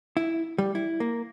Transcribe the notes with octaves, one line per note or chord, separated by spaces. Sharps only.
E4
G3
E4
A#3